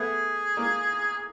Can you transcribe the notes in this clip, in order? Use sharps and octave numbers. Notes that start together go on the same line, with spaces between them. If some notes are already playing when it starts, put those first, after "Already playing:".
Already playing: A3 B3 G#4
G#3 A#3